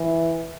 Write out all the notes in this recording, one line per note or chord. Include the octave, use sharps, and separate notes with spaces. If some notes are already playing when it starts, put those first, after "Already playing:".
Already playing: E3